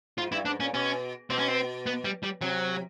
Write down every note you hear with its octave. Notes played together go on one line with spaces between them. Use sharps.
G#2 F4
G2 E4
G#2 D4
A#2 C#4
B2 C#4
B2 C4
C#4
C4
B3
G3
G3
C3 F#3